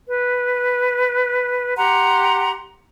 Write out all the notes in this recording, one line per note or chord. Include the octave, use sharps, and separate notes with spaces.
B4
G4 F#5 A#5 C6